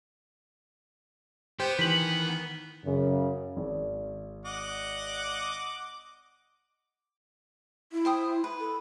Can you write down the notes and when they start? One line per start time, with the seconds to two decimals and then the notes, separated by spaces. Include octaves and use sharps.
1.59 B3 G4 C5 G5
1.79 D#3 E3 B6 F#7
2.85 F#2 C#3
3.57 G#1
4.46 D#5 F#5 D6
7.92 E4
8.05 C5 G5 D#6
8.44 B4
8.60 A4